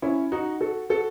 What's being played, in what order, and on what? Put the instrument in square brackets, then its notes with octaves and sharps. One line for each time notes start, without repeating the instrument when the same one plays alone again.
[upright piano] C#4 E4
D#4 F#4
F#4 A4
F#4 A4